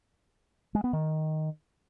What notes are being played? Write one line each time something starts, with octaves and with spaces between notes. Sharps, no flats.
G#3
B3
D#3